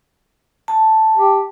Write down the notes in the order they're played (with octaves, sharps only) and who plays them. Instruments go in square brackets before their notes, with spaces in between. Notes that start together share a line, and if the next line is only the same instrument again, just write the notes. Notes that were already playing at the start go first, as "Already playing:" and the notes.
[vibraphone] A5
[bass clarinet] G4